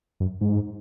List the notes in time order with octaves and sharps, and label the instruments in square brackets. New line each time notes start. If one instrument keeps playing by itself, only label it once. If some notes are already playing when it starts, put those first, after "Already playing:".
[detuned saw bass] F#2
G#2